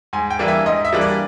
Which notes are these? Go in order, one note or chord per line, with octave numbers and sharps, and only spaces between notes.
G#2 G#5
G5
E3 G3 A#3 D4
E5
G#2 D#5
E5
E3 G3 A#3 D4
D5